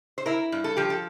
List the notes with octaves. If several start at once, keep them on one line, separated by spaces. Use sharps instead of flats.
C5
E4 A#4
G2
A4
F3 G4
A4